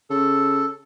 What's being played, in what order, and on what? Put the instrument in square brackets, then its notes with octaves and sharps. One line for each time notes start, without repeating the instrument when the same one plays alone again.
[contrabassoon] C#3 [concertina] A4